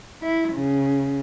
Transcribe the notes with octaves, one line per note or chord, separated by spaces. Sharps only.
E4
C#3